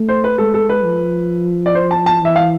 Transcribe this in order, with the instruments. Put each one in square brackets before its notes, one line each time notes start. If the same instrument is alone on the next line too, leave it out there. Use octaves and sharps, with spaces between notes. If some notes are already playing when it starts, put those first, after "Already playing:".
Already playing: [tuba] A3
[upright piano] C5
B4
[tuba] G#3 [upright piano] A4
[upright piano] A4
B4
[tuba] F3
[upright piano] D5
C5
A5
A5
[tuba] E3 [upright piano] E5
[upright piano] F5